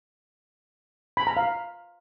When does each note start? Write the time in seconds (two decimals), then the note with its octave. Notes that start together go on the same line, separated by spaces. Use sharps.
1.17 B5
1.27 A#5
1.37 F5